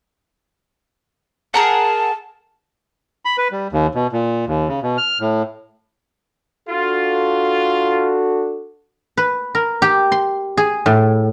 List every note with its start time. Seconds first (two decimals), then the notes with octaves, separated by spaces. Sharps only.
1.54 G#4 A#4 F#5 A5
3.25 B5
3.38 B4
3.52 G3
3.72 D#2
3.95 B2
4.12 A#2
4.47 D#2
4.68 C#3
4.83 B2
4.98 F6
5.20 A2
6.68 D4 F4 F#4 A4
9.17 B4
9.55 A#4
9.82 G4
10.12 C6
10.57 G#4
10.86 A2